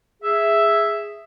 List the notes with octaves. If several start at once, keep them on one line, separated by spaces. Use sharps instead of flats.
G#4 E5